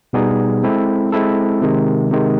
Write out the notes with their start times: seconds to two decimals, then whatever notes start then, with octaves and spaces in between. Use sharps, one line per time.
0.13 B2 G3 B3 D#4 G#4
0.63 G#3 C4 E4 A4
1.12 G#3 C4 E4 A4
1.62 C3 D#3 G#3
2.11 C3 D#3 G#3